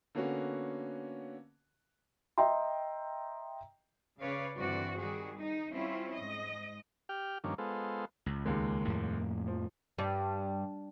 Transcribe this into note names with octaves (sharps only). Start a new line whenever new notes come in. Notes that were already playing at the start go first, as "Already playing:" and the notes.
D3 A#3 B3 C#4 F#4
D#5 E5 G5 A#5 C6
C#3 B4 C#5 D5 F5
G2 D3 E3 C4 F#4 D5
D#3 G3 F#4 G#4
D#4
G3 C4 C#4 E4 F4
G#2 D#5
G4 G5 F6
G2 D#3 F3 A#3 C#4 D4
G#3 B3 F4 A4 C5
C#2
D#2 G#3
F2 A2 A#3
F3
G2